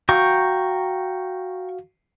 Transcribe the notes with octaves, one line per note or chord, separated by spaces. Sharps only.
F#4 F5 G5 A#5 C#6